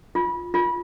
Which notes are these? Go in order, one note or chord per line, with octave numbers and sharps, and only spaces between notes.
F4
F4